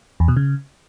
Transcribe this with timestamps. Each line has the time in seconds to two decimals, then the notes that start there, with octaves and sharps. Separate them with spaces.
0.20 E2
0.28 B2
0.37 C#3